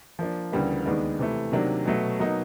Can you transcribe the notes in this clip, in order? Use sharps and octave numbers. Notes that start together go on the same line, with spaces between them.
F3 A#3 D4
D2 C#3 E3 G3 A#3
D#2 D#3 G#3 B3 D4
C3 E3 A3
C3 D#3 F#3 A#3 D4
B2 F#3 A3
B2 F#3 A#3 D#4